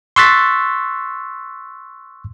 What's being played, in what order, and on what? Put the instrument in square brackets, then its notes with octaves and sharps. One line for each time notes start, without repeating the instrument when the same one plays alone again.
[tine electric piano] C6 C#6 E6 F#6 A6 B6